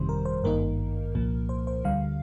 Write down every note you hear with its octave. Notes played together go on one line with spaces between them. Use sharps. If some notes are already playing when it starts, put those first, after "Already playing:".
Already playing: G1 F2 C3 D#3 G3 C5
A#4
C5
G#1 G2 D#3 A#3 D#4 A#4
C2 A#2 F3 A#3
C5
C5
D2 D3 G3 F5